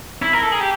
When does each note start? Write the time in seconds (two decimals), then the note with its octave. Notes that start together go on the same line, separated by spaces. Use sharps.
0.22 E4
0.33 A#4
0.43 A4
0.52 G#4
0.61 G4